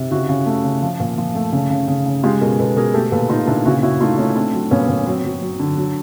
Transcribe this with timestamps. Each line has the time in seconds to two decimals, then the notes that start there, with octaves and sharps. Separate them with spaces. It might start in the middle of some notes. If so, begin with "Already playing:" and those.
Already playing: C3
0.11 C#3 E4 F#4
0.29 C#3
0.46 A3
0.64 C#3
0.82 F3
1.00 A#2
1.18 F3
1.35 A3
1.53 C#3
1.70 C#3
1.88 C#3
2.06 C#3
2.23 G#3 F4 G4
2.41 B2 G#4 A#4
2.59 B2 A4 B4
2.76 B2 G#4 A#4
2.94 A3 G4 A4
3.12 A#2 A4 B4
3.29 A#2 D#4 F4
3.47 A#2 D4 E4
3.65 C#3 E4 F#4
3.83 C#3 E4 F#4
4.01 A3 D#4 F4
4.18 A3 C#4 D#4
4.36 A3 C4 D4
4.53 F#3
4.71 A#2 B3 C#4
4.89 A#2
4.97 C#4
5.06 F#3 C4
5.25 F#3
5.42 F#3
5.60 D3
5.77 F#3